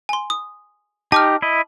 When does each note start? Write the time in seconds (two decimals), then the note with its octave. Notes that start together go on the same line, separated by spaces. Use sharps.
0.09 G#5 C6
0.30 D#6
1.12 D#4 G4 A5 D6 F6
1.42 E4 D#5